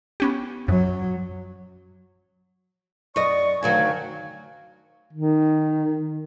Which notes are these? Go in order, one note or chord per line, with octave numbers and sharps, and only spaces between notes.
B3 C#4 G4
F#2 F#3
F#2 D5 D#5 C#6
D2 D#3 F#3 F5 G#5
D#3